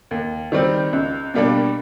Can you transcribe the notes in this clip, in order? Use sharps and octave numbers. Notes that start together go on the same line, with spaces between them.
D#2
D#3 G3 C4
C#2
B2 G3 A#3 D4